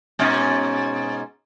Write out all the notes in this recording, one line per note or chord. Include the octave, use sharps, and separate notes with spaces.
G#2 B2 C#4